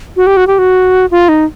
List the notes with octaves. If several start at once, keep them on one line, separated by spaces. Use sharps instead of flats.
F#4
G4
F#4
G4
F#4
F4
D#4